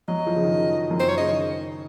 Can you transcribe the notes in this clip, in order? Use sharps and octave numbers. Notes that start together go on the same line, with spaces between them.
F#3 D#5
F3
C#3
D#3
F#2
C5
C#5
C#3 D#5
D#3